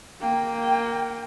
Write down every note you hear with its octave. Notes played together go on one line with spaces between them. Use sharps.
A#3 G5